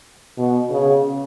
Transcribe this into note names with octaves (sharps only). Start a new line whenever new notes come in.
B2
C#3